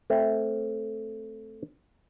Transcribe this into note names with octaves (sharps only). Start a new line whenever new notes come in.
A3 C4